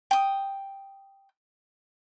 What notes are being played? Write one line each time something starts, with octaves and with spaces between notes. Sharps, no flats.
G5 D#6